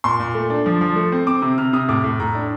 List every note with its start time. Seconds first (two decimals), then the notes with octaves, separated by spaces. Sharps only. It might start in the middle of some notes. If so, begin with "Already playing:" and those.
0.04 A#2 C6
0.19 A#2
0.34 A3
0.50 D4
0.66 F3
0.81 F3
0.96 A3
1.12 C4
1.27 C4 D6
1.42 C3
1.58 C3 F6
1.73 C3 D#6
1.89 A2 D6
2.04 A2
2.20 A2 A#5
2.35 D4